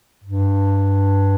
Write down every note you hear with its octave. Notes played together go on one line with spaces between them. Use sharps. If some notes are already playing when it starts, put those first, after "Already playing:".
G2